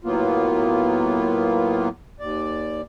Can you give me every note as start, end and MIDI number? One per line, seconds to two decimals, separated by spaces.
0.04 1.88 45
0.04 1.88 54
0.04 1.88 58
0.04 1.88 59
0.04 1.88 65
2.20 2.81 39
2.20 2.81 74